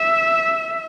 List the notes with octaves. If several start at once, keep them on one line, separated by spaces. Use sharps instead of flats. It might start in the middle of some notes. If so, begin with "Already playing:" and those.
Already playing: E5